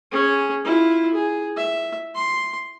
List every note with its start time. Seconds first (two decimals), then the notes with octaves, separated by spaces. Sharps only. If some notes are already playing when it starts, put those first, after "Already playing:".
0.12 C#4 G#4
0.65 E4 F4
1.14 G#4
1.56 E5
2.15 C6